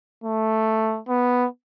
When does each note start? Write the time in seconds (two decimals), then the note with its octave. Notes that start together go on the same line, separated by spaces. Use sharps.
0.24 A3
1.08 B3